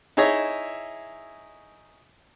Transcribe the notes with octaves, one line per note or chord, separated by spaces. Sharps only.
D#4 E4 G#4 C#5 D#5 E5